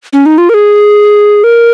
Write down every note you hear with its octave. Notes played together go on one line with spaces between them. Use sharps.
C#4
D#4
F4
A#4
G#4
A#4